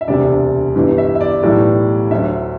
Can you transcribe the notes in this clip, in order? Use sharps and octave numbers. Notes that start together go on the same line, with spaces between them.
E5
E1 D2 C3 G3 D5
G1 G2 E3 G3
E5
E5
D5
B1 A2 E3 G3 D5
D2 D3 F#3 E5